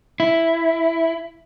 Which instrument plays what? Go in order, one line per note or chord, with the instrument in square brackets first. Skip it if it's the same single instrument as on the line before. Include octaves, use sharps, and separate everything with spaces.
[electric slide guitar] E4